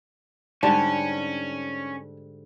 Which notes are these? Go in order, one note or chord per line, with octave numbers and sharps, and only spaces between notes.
G#2 D3 G3 C#4 F#5 A5